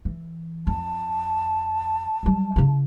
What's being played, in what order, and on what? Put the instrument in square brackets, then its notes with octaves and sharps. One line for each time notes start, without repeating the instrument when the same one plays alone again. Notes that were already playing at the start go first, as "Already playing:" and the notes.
[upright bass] E3
[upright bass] F2 [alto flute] A5
[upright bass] F#3 G3
C#3 E4